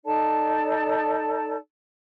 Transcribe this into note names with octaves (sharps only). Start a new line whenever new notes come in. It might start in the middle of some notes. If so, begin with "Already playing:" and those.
D#4 A4 D5 A5